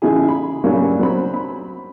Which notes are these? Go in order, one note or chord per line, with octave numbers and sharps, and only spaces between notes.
A1 C#3 D#4 E4 G#4
B5
G2 C#3 F#3 G3 A#3 C#4
F#3 C4 B5
B5